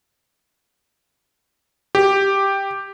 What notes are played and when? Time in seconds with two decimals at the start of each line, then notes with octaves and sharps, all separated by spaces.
1.95 G4